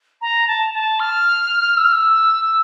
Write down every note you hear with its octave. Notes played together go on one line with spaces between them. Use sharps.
A#5
A5
A5
F6
E6
F6
E6